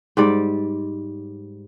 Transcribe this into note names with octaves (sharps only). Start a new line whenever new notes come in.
G#2 G3 D5